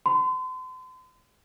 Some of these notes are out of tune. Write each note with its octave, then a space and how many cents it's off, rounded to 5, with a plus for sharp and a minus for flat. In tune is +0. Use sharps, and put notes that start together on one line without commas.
C6 -40